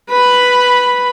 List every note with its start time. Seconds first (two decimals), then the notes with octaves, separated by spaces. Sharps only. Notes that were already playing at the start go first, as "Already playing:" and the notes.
0.10 B4 B5